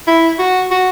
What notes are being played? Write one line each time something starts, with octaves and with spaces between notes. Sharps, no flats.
E4
F#4
F#4